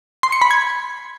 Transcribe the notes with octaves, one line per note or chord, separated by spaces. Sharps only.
C6
C#7
B5
G#6